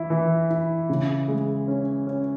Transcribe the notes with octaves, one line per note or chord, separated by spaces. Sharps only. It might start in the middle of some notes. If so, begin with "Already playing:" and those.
Already playing: E3 E4
E3
E4
C#3
G#3
C#4
C#4